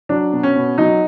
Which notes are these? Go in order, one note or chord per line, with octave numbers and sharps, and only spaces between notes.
F#3 D4
B2
C#4
B2
F#3 D#4